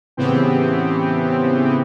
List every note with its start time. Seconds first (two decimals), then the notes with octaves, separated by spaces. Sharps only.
0.17 A2 C#3 E3 B3 C4 G4